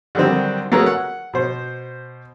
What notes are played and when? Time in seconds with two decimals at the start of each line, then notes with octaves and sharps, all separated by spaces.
0.15 D3 D#3 F#3 G3 C4
0.72 A3 F#4 G#4 A#4 B4 C#5
0.86 F#5
1.33 B2 C5